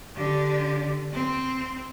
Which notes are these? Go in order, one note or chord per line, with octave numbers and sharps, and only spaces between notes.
D3 G4
C4